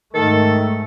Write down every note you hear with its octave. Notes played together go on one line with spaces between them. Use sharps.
G#2 D#3 A3 A4